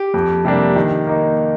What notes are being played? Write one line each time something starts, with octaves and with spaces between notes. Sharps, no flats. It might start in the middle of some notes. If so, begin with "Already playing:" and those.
Already playing: G4
F2
C3 G3 A#3 D4
D#3
A#3 D#4